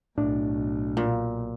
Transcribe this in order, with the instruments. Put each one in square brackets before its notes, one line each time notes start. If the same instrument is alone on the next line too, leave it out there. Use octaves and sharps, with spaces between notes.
[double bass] B1 [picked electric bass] A2 [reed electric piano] D4
[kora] A#2